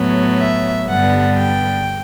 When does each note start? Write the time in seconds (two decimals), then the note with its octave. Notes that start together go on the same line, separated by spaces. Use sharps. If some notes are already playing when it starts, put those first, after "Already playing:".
Already playing: A2 F#3 B3
0.38 E5
0.87 G2 D3 G3 B3 F#5
1.37 G5